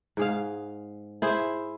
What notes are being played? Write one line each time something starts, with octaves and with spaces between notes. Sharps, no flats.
G#2 G#4 F5
E4 G#4 C5 E5